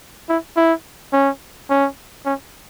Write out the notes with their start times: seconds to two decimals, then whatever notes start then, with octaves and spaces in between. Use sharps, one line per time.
0.29 E4
0.56 E4
1.13 C#4
1.70 C#4
2.25 C#4